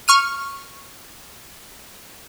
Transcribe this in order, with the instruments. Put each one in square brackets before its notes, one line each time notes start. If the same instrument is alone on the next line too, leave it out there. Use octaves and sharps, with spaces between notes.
[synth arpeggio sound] C#6 F6 D#7